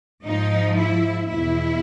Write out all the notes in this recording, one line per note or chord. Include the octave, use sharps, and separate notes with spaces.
G#2 F3 D#4
E4
E2 B2 E4